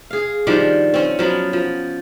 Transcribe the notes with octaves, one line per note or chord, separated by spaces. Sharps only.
G#4 F5
D#3 F3 G3 D4
C4 C#4
F3 F#3 B3
F3